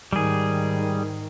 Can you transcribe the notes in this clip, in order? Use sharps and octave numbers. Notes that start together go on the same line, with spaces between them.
G#2 D#3 G3 G#4